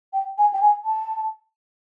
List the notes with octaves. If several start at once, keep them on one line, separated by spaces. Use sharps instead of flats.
G5
G#5
G5
G#5
A5